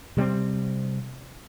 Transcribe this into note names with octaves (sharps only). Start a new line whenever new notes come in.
C3 G3 A3 C4